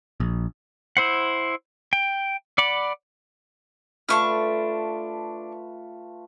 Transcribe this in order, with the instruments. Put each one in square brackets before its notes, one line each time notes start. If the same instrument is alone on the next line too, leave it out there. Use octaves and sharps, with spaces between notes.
[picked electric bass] A#1
[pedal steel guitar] E4 C5 F#5
G5
D5 F#5 B5 D6
[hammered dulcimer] A3 F4 B4 [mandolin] D4 C#6 F6